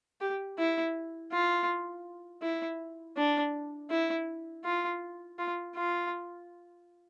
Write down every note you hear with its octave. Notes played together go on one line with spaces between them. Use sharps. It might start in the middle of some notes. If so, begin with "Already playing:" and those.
G4
E4
F4
E4
D4
E4
F4
F4
F4